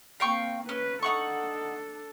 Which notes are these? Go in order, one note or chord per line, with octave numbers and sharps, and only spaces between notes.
A#3 C4 F5 G5 C#6
C#4 B4
D4 D#4 A4 F#5 C#6